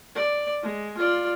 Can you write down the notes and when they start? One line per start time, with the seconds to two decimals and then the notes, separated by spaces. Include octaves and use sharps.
0.15 D5
0.63 G#3
0.97 F4 D5